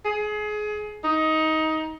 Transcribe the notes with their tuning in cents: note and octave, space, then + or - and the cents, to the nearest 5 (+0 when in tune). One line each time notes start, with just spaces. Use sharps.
G#4 +25
D#4 +15